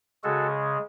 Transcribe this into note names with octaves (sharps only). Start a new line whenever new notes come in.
C#3 G#3 F#4 A4